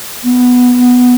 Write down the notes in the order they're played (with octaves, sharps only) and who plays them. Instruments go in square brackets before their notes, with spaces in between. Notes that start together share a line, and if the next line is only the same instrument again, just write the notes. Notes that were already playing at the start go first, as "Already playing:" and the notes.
[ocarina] B3